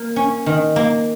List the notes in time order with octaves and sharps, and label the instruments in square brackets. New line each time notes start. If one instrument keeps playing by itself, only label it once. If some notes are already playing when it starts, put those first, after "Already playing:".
Already playing: [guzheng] A#3
C#4
D#3
A#3